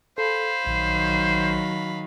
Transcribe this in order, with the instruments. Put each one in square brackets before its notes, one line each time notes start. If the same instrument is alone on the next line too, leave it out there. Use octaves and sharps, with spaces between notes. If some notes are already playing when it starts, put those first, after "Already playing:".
[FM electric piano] A4 [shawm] C5 [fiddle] F5 B5
[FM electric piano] A#1 [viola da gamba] D#3 F#3